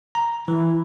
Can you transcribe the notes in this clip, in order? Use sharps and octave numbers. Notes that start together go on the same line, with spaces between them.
A#5
E3 E4